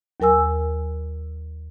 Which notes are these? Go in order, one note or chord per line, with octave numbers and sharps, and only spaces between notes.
D#2 F#3 A#4 G#5 E6